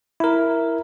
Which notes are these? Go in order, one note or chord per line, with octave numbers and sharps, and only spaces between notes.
E4 A#4